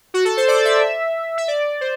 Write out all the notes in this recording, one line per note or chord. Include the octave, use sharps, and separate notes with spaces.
F#4
A4
C5
D5
E5
E5
D5
C5